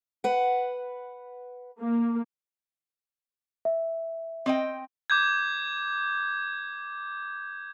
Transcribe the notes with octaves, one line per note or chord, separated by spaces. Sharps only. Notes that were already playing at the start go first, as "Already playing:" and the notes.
B4 F#5
A#3
E5
C4 D#5 G5
D6 G6 G#6